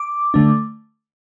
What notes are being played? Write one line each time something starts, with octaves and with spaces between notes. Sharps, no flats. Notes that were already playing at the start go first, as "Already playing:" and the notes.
Already playing: D6
D3 A3 D4